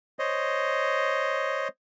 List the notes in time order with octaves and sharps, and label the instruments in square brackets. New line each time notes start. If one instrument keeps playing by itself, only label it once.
[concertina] C5 C#5 D#5